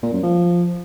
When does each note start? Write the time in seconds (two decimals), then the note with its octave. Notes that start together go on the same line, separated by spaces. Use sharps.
0.03 A#2
0.13 F#2
0.23 F3